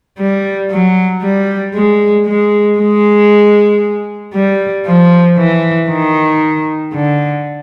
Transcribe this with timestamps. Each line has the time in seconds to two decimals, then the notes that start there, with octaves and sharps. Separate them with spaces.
0.19 G3
0.71 F#3
1.22 G3
1.74 G#3
2.26 G#3
2.78 G#3
4.34 G3
4.86 F3
5.38 E3
5.89 D#3
6.93 D3